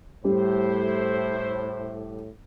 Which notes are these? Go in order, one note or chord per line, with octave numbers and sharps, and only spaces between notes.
A2 G3 E4 G4 C5